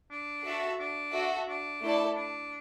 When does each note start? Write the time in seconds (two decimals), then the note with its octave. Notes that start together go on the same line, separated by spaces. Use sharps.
0.11 D4
0.45 F#4 A4 E5
0.79 D4
1.13 F#4 A4 E5
1.48 D4
1.82 A3 E4 A4 D5 A5
2.16 D4